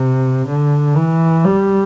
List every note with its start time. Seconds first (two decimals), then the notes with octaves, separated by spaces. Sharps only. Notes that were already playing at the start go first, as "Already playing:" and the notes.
Already playing: C3
0.47 D3
0.96 E3
1.45 G3